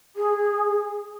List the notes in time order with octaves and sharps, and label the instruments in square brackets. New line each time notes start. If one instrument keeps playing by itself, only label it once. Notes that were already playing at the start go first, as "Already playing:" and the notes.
[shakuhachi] G#4